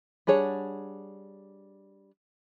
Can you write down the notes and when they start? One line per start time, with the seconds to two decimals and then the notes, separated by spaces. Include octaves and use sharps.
0.27 G3 D4 G#4 C#5 F#5